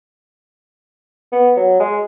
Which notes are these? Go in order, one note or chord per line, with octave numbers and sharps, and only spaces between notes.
B3
F#3
G#3